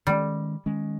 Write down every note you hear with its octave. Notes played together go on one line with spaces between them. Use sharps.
D#3 G3 G#3 C#4
D#3 G#3 C#4